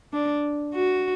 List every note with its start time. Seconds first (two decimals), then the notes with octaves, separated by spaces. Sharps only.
0.13 D4
0.75 F#4